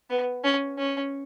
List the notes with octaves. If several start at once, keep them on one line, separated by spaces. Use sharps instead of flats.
B3
C#4
C#4